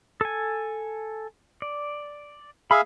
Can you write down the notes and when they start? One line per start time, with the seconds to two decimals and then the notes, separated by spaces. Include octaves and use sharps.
0.21 A4 G#5
1.62 D5
2.71 G#4 E5 F5 B5 E6